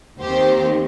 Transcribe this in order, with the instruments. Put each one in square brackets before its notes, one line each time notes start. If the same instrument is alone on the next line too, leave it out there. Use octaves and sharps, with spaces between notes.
[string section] D#2 D#3 C4 G4 C5